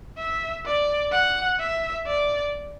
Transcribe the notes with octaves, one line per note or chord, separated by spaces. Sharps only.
E5
D5
F#5
E5
D5